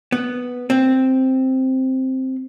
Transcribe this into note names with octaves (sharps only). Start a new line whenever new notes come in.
B3
C4